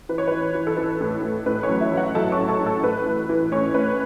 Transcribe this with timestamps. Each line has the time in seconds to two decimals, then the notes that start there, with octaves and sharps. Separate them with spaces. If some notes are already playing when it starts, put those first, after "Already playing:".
0.09 E3 B4
0.18 C#5
0.28 E3 B4
0.55 E3
0.67 A4
0.77 E3 B4
1.01 A2
1.23 A2
1.46 A2 B4
1.63 C#4 C#5
1.69 F#3
1.81 E4 E5
1.92 F#3
1.97 F#4 F#5
2.15 F#3 A4 A5
2.32 C#5 C#6
2.38 A2
2.49 A4 A5
2.61 A2
2.66 A4
2.83 A2 B4
3.06 E3
3.29 E3
3.52 A2 C#4 C#5
3.74 A2 B4